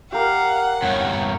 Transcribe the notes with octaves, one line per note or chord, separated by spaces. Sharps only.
G4 A#4 F5 F#5
E2 G2 C#5